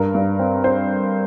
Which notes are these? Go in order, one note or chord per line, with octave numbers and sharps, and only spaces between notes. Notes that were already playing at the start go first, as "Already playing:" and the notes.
Already playing: G2 A#4
G2
C4
C4 C5